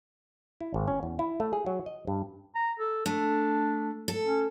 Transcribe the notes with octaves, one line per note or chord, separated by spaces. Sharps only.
E4
G#1
C#4
E2
E4
A3
G#4
F#3
D#5
G2
A#5
A4
A3 D4
A4
C#4